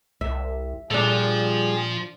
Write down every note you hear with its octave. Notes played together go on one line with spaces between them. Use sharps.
C2 E5
A#2 F3 G3 D4 G#4 A4